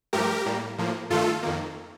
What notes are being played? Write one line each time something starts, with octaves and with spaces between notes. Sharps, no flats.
G2 F3 A3 G4 A#4
A2 G3 A#3
A2 F3 A#3
G2 D#3 A3 F4 A4
F2 D#3 A#3